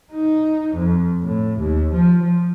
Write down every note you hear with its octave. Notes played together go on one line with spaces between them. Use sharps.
D#4
F2
A2
D#2
F3
F3